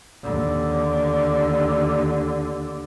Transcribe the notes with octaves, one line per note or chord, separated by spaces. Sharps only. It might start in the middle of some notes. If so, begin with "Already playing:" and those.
D#2 D3